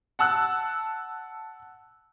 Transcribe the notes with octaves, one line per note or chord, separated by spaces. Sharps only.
F#5 A5 E6 F#6